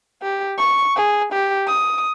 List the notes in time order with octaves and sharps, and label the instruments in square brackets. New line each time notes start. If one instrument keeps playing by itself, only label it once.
[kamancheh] G4
C#6
G#4
G4
D#6